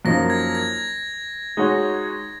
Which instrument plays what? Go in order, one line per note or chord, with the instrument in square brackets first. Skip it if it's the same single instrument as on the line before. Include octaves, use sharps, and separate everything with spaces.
[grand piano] F#2 F3 A#3 D#4 [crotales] A#6
[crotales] G#6
G#6
[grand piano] G#3 D#4 F#4 C#5